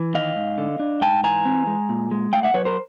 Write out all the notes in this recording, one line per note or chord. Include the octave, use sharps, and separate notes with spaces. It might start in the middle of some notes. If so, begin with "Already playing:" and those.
Already playing: E3
D#3 D#5 F5
G#2
D3
D4
G#2 G5 A5
E3 G#5 A#5
C4
G#3
A#2
G#3
A3 F5 G5
E5 F#5
F#3 B4 C#5
A#4 C5